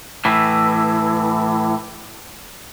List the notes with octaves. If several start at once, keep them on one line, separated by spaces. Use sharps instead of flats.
A2 E3